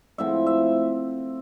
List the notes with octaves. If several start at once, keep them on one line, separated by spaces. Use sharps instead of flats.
A2 F3 C4 E5
E5